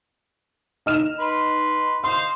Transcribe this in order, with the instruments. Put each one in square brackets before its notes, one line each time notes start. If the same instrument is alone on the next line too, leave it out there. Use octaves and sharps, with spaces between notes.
[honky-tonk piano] D#4 F6 E7
[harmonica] B4 C6
[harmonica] C5 D#5 F5 [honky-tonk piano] C6